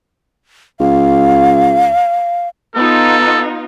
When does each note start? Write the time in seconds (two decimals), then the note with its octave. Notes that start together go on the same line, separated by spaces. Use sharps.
0.80 C#2 F5
2.75 B3 D#4 F4 A4